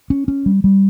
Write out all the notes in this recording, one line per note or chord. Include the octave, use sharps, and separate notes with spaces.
C#4
C#4
G3
G3